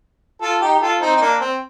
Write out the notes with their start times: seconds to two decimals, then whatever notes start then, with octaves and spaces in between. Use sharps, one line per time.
0.42 F4 A4
0.62 D#4 G4
0.74 G4
0.81 F4 A4
1.01 C4 D#4
1.16 D#4
1.21 A#3 D4
1.40 C4